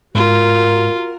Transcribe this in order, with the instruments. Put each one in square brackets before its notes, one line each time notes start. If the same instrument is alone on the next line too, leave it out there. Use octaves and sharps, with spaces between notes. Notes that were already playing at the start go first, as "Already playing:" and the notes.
[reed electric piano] G#2 [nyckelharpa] F4 [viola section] F#4 A#4